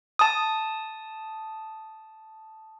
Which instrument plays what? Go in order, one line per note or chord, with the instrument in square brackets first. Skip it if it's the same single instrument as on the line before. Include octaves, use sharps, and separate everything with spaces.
[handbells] A5 D#6